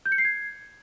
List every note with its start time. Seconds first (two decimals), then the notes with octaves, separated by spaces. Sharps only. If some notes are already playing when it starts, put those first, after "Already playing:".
0.06 G6
0.12 C#7
0.18 C7
0.25 G#6